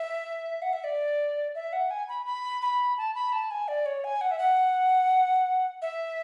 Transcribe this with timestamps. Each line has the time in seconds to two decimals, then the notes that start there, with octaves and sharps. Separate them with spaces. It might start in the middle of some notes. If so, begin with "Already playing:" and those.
Already playing: E5
0.62 F#5
0.73 E5
0.84 D5
1.55 E5
1.73 F#5
1.91 G#5
2.09 B5
2.26 B5
2.62 B5
2.98 A5
3.15 B5
3.33 A5
3.51 G#5
3.68 D5
3.86 C#5
4.04 G#5
4.21 F#5
4.31 E5
4.39 F#5
5.82 E5